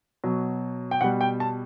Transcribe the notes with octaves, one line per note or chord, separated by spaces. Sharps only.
B2 F#3
G5
B2 G3 F#5
G5
A5